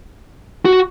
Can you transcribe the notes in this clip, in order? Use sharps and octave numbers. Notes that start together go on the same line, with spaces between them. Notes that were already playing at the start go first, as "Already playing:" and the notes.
F#4